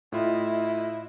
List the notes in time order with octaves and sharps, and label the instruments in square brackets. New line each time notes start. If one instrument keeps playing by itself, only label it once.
[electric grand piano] A2 F4 [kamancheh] E4 D#5